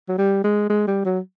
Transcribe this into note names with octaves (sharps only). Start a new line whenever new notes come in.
F#3
G3
G#3
G#3
G3
F#3